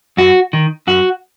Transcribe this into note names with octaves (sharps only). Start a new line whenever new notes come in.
F#2 F#4
D#3
F#2 F#4